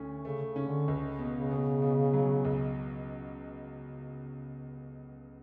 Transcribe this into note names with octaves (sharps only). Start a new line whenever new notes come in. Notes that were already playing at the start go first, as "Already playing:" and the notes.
Already playing: D2 A3 C#4
C#3 A3
C#3
C#4
D3
C#2
B2
C#3
B2
B2
F#3
C#2